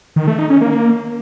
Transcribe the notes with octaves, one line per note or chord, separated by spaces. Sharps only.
D#3
A3
D#4
C#4
A#3